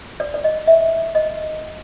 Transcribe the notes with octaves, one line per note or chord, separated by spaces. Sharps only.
D5
D5
D#5
E5
D#5